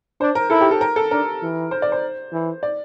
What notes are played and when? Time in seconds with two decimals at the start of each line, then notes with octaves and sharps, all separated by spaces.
0.20 D4 C5
0.35 A#4
0.50 E4 A4
0.61 G4
0.71 A4
0.81 A#4
0.96 A4
1.11 D4 A#4
1.42 E3
1.71 C5
1.82 D5
1.92 C5
2.32 E3
2.63 D5